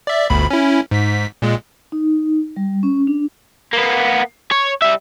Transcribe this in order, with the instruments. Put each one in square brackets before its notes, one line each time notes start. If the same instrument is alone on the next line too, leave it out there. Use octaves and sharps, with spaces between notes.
[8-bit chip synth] D5 E5
G1 D2 B5
C#4 E4
G#2 B6
A#2 G#3
[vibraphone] D#4
G3
C#4
D4
[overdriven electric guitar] A#3 B3
C#5
G3 E5